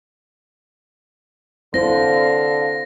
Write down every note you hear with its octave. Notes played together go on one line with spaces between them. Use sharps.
D3 C4 E4 C5 F5 A#6